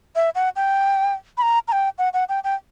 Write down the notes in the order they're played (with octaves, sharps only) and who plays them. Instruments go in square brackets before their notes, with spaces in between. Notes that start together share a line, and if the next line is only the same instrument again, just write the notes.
[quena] E5
F#5
G5
B5
A#5
A#5
G5
F#5
F#5
G5
G5